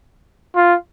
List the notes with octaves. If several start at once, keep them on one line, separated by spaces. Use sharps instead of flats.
F4